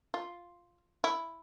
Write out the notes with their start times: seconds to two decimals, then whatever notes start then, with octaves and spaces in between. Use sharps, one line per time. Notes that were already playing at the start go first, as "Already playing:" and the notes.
0.14 F4
1.04 E4